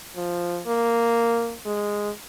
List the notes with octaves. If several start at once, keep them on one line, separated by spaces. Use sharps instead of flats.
F3
A#3
G#3